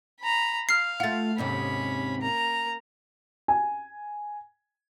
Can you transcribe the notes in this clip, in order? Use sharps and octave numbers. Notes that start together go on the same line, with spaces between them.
A#5 B5
F5 F6 C7
A3 F4 F#5 A6
D#2 G#2 C3 C#4 B5
A#3 A#5
G#5